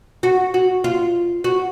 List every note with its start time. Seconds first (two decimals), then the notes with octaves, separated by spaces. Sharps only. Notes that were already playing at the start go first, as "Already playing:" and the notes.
0.23 F#4
0.54 F#4
0.84 F4
1.44 F#4